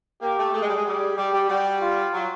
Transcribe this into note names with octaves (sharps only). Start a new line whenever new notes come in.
A#3 G4
A3
A3 G#4
G#3
G3
G#3
G3 G#4
G3 G4
G3
G3 F#4
F4
F#3